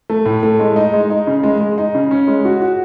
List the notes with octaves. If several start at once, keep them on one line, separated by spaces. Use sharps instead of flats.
A3
A2
A3
G#3
D#4
G#3
D#4
C#3
G#3
G#3
D#4
C#3
C#4
G#3
F#4
F#4